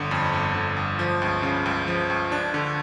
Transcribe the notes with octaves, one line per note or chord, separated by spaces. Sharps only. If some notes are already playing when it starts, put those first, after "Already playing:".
Already playing: G1 D3
F2
G1
D3
G1
F3
C#2
C#3
C#2
F3
C#2
D4
D3